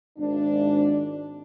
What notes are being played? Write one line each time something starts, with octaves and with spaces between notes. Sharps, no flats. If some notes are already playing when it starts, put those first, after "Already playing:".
G#1 D4